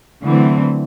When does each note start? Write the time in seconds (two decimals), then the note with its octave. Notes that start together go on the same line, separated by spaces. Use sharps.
0.23 D3 E3 F#3 A3 C4